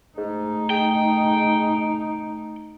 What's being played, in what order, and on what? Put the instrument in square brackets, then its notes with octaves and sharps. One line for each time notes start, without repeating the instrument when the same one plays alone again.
[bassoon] G#2 [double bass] A3 D#4
[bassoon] G#4 [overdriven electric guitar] G5